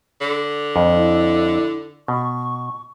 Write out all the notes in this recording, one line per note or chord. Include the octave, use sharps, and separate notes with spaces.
D3
F2
E4
B2 C#6